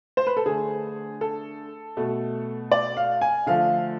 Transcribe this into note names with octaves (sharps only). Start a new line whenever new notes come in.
C5
B4
A4
D3 A3 G#4
A4
B2 A3
D5
F5
G#5
D3 F3 A3 F5